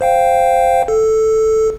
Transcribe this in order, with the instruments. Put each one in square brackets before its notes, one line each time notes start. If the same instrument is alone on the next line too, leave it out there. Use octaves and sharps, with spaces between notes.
[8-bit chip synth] C5 F5 G5
A4